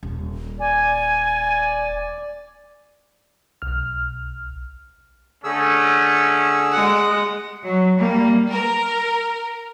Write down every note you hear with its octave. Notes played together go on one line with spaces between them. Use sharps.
D#1
D5 G#5
B1 F6
D3 A3 C#4 G#4 E6
G#3 F#5
F#3
G3 A#3
A#4